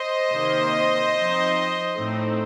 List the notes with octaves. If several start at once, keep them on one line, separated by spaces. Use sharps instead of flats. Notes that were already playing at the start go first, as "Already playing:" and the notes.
Already playing: C5 D#5
C3 D#3 A#3
F3 C4 D#4
A2 A3 C4 D#4